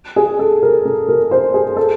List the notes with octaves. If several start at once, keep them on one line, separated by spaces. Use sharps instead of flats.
G#4
A4
A#4
A4
A#4
C5
G#4
A4